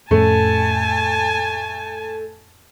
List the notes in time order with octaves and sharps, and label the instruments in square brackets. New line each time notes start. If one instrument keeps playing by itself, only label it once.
[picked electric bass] F2 A2 C#4 [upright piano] A3 [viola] G#5 A5